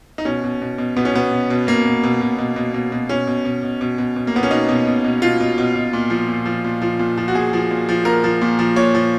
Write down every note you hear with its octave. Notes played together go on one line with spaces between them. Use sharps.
D#4
B2 C#4
B2
B2
B2
B2 B3
C#4
B2 B3
B2
B2
B2 A#3
B2
B2
B2
B2
B2
B2
B2
B2 C#4
B2
B2
B2
B2
B2
B2
A#3
B2 B3
C#4
B2 D#4
B2
B2
B2
B2 F4
B2
B2
B2
A#2
F3
A#2
F3
A#2
F3
A#2
F3
F#4
A#2 G#4
F3
A#2
F3
A#2 A#4
F3
A#2
F3
A#2 C#5
F3